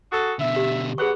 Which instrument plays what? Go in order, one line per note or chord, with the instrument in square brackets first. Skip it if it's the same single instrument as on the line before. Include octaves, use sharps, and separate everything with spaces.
[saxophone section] F#4 G#4 A4
[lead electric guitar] B2 D3 [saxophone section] E5
[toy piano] G4
[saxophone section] F#3 B3 F#5 [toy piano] G#4 C#6